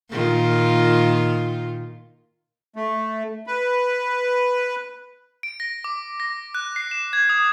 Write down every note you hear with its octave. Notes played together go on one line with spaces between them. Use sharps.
A#2 D#3 F4
A3
B4
D7
A#6
D6
A#6
F#6
C7
E7
G#6
D#6